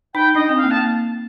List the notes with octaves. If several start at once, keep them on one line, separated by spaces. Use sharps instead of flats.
D#4 G5
D4 D#5
C4
F5
A#3
A5